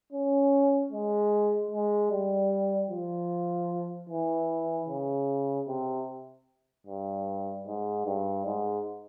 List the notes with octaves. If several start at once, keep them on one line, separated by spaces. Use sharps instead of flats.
C#4
G#3
G#3
G3
F3
E3
C#3
C3
G2
G#2
G2
G#2